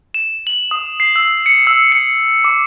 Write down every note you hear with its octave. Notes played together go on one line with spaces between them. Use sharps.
E7
F#7
D#6
C7
E6
C#7
E6
C#7
D6